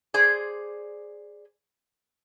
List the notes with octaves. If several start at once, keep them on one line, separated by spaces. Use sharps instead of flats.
G#4 C5 D5